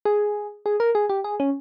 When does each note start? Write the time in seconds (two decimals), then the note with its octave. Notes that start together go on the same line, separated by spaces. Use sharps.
0.05 G#4
0.66 G#4
0.80 A#4
0.95 G#4
1.09 G4
1.24 G#4
1.40 C#4